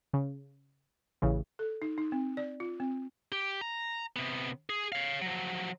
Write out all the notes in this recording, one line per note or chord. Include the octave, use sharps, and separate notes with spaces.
C#3
A1 C#3 E3
A4
D#4
D#4
C4
D5
F4
C4
G4
A#5
C3 B3
G#4
C#5 F5
F3 F#3